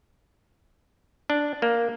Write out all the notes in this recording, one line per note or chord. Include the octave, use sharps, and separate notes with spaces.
D4
A#3